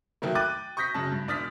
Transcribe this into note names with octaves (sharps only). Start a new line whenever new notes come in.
D#3 F#3 A3 A#3
G5 D6 F#6 A6 D#7
C#6 D#6 G6 A#6 B6
F#2 C#3 A5
G2
E1 D4 D#6 F6 A6 B6